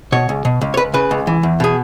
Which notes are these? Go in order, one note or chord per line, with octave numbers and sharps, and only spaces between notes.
B2 C#5
C#2
B2
C#2
C#5
C#2 B4
C#3 B4
C#2
E3
E2
B2 G#4